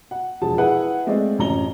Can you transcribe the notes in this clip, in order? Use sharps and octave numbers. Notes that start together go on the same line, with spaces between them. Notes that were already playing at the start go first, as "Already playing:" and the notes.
F#5
E1 F3 G#4 A5
E4 G#4 B4 F#5
G#3 A3 C4 D5 D#5
A1 F#2 F4 A#5 G7